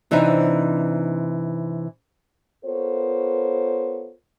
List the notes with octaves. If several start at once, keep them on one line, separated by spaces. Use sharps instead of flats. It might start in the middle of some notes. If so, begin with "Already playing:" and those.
C3 E3 C4 D4 D#4
B3 F4 A4 A#4 C5 C#5